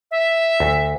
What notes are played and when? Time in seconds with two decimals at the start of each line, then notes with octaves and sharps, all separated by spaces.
0.11 E5
0.60 D2